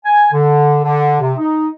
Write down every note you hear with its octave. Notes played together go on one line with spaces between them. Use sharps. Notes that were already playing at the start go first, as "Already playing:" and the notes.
G#5
D3
D3
C3
D#4